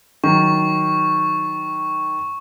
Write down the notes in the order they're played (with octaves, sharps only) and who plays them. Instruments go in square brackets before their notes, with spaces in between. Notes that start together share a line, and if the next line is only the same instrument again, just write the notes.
[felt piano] D#3 F#3 [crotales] C#6